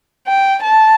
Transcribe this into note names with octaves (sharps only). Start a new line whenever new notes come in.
G5
A5